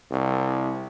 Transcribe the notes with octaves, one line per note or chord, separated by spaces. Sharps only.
C2